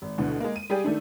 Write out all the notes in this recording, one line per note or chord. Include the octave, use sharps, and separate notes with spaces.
G#1
D2 B2 D3 E3
G#3 A#3
D#7
G3 G4 G#4 D5 G5
D#3 A3 D4